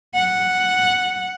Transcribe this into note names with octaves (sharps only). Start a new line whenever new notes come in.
F#5